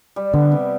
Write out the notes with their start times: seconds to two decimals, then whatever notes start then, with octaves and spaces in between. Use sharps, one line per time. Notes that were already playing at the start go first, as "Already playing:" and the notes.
0.16 G3
0.33 D3 B3
0.52 C3